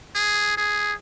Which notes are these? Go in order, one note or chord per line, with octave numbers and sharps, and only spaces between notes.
G#4
G#4